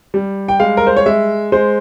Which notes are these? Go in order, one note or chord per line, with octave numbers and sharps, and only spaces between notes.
G3
G5
G#3 F5
A#4
C5
C#5
G#3 E5
G#3 C5